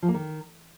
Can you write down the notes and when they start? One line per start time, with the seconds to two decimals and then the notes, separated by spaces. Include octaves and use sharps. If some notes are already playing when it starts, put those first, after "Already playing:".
0.02 F3
0.08 A#3
0.14 D#3